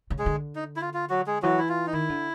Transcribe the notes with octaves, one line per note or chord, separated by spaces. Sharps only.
C#3
G#3 G#4
D3
D#4
E4
F4
F4
F#3 F#4
G#3 G#4
E3 F#3 F#4
E4
F4
D#4
D#3 E4
D3